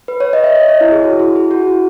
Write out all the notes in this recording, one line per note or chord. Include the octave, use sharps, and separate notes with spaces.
B4
C#5
D#5
E5
D#5
C#5
E4
G#4
F#4
E4
G#4
F#4
E4